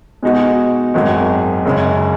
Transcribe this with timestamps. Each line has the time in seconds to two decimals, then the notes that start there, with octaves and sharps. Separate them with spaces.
0.23 B2 G#3 D#4 F#4
0.94 G#1 F#2 D#3 G#3
1.65 F#1 F#2 C#3 G#3